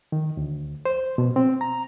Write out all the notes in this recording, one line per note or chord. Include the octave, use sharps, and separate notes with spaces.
D#3
D2
C5
B2
C4
A#5